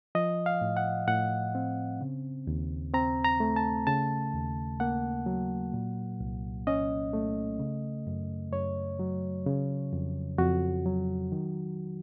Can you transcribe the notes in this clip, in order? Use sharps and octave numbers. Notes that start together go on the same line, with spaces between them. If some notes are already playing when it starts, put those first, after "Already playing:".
F3 D#5
F5
A2
F#5
A2 F#5
C4
C#3
D#2
C4 A#5
A#5
A3
A5
C#3 A5
D#2
A#3 F#5
F#3
A#2
C2
C#4 D#5
A3
C#3
F#2
F#2 C#5
F#3
C#3
F2
F2 F#4
F#3
D#3